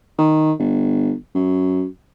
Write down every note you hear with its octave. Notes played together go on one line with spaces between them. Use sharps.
D#3
G1
F#2